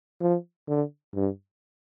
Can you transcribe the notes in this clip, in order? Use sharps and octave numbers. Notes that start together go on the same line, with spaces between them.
F3
D3
G2